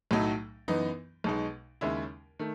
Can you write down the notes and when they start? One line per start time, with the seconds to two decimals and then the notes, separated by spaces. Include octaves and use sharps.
0.11 B1 A2 F#3 A3 D#4
0.68 F#2 E3 B3 D#4
1.24 B1 B2 G#3 D#4
1.81 D#2 C#3 G#3 C#4 E4
2.39 D#3 A3